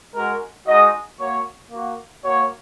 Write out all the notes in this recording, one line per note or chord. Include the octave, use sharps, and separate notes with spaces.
G#3 F#4 A#4
G#3 D#4 F#4 D#5
A#3 F#4 C#5
A#3 F#4
A#3 F#4 C#5